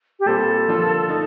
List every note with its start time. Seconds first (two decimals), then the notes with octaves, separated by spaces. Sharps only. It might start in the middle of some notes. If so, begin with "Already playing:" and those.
0.19 G4
0.26 A#2 G3 C4 F4 A4 C5
0.68 D3 F3 A#3 D4 F4
1.09 A3 D#4 A4